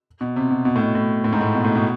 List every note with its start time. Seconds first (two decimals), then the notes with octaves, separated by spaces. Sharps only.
0.21 B2
0.36 C3
0.51 B2
0.65 B2
0.76 A2
0.81 B2
0.95 A2
1.24 A2
1.33 G#2
1.41 A2
1.55 B2
1.65 A2
1.75 B2